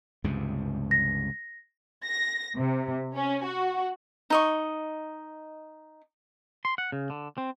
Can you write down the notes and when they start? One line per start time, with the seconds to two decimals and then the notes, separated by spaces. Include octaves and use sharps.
0.24 C#2 G2 C3
0.91 A#6
2.04 A#6
2.56 C3
3.15 C#4
3.45 F#4
4.30 D#4 D#5 C#6
6.65 C6
6.78 F#5
6.92 C#3
7.10 D3
7.38 C4